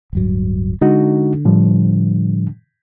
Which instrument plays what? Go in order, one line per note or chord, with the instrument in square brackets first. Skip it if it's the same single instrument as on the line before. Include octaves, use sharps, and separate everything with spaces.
[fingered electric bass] D1 G2 F#3
[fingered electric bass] D3 [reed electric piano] G#3 D#4 F#4
[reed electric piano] A2 F3 G3